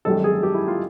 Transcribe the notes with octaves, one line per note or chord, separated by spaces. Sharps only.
G#1 F#2 D#3 G3 A4
G#4
G4
E4
F4